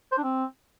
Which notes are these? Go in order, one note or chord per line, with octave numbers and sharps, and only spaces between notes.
C5
D4
C4